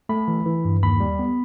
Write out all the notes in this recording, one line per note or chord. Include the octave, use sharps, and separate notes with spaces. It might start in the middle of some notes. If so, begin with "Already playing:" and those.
A3 B5
E3
E3
G2
D#2 B5
G3
B3